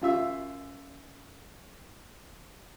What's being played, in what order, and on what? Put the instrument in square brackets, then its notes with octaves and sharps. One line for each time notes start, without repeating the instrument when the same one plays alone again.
[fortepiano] F#2 F4 E5 E6